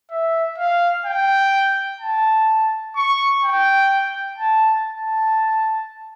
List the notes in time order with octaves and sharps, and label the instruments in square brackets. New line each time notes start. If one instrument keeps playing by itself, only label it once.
[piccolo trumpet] E5
F5
G5
A5
C#6
G5
A5
A5